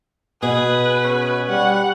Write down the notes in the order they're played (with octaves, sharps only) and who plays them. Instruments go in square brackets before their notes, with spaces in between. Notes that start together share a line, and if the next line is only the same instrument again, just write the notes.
[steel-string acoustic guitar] B2 [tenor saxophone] G#4 [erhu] B4
[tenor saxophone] C#4
[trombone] G3 [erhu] F#5